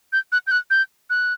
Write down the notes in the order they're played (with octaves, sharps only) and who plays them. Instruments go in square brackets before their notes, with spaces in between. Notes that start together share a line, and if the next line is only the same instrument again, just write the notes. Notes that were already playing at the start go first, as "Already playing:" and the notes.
[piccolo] G6
F#6
G6
F#6
G6
F#6